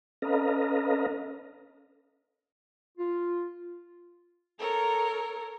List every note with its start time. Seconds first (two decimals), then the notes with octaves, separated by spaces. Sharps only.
0.22 C#4 A4 B4 D#5 F5 A#5
2.98 F4
4.59 A4 A#4 C#5